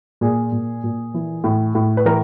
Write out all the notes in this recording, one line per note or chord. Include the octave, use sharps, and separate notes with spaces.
A#2 G#4
A#2
A#2
E3
A2
A2
B4
E3 A#4